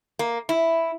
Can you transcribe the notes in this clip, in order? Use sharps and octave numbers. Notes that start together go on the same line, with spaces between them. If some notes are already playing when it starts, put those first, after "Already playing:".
A#3
E4